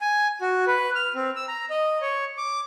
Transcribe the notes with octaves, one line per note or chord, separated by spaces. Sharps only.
G#5
F#4
B4
F6
C4
E6
A#5
D#5
C#5
D6